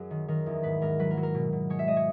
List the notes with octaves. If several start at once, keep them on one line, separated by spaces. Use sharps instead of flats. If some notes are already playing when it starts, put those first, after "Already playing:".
Already playing: F#2 F#3 G#4 A#4
D#3
D#3 A#4
E2
G#2 B4
G#2 A#4
F#3 B4
A#4
F#3
A#4
B2
B2
G#3 C#5
E5
G#3 D#5
C#5